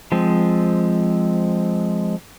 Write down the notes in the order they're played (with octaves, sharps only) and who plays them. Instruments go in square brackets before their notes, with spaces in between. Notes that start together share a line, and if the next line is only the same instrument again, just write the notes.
[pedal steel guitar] F3 G#3 C4